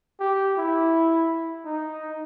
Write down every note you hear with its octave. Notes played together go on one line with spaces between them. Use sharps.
G4
E4
D#4